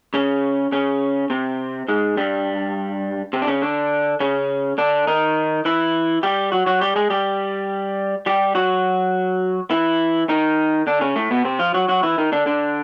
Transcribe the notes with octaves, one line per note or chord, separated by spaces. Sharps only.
C#3 C#4
C#3 C#4
C3 C4
G#2 G#3
G2 G3
C3 C4
D4
C#3 C#4
D3 D4
C#3 C#4
D3 D4
D#3 D#4
E3 E4
G3 G4
F#3 F#4
F#3 F#4
G3 G4
G#3 G#4
G3 G4
G3 G4
F#3 F#4
E3 E4
D#3 D#4
D3 D4
C#3 C#4
A2 A3
B2 B3
C3 C4
F3 F4
F#3 F#4
F#3 F#4
E3 E4
D#3 D#4
D3 D4
D3 D4